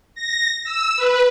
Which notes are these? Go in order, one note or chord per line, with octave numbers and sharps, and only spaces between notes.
A#6
E6
B4